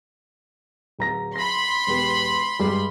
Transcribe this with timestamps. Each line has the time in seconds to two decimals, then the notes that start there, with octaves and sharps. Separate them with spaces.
0.98 D1 A#5 A#6
1.36 B5 C6 A#6
1.87 E1 B3 G4
2.59 G2 G3 G#3